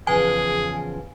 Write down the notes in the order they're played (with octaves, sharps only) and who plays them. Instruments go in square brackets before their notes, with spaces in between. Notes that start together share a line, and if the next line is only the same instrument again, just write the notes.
[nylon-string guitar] E2 C#3 F3 [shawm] G#4 [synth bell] G#5